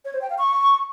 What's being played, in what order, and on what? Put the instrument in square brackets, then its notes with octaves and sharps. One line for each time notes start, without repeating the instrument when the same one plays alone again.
[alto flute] C#5
C5
G5
F5
C#6